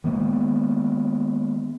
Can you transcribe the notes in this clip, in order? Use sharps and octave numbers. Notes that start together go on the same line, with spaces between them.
D#3 G#3 A#3 B3